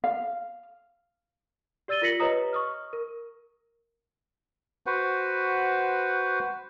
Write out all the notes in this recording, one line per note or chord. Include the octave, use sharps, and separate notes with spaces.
F5
G4 D5 E6 A6 D#7 G7
F4 A#4 A#6 B6 C#7 F#7
G4 B4 C#5 D#5 A#5 D#6
C#6 D#6 F6
A#4
F#4 B4 C5 F#5